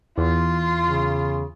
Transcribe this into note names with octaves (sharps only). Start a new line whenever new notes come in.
E2 F4 C6
C#3